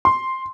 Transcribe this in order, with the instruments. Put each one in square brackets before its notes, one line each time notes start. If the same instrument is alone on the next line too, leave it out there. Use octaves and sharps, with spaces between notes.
[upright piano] C6